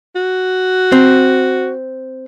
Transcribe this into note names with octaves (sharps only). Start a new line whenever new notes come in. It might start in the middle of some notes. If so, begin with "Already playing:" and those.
F#4
C4